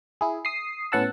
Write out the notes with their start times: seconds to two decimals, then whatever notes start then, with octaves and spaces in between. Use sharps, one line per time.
0.21 E4 G#4
0.45 D#6 C7
0.92 A2 B3 C#4 F#5 A5 E6